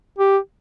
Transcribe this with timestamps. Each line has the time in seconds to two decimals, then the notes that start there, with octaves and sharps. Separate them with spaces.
0.19 G4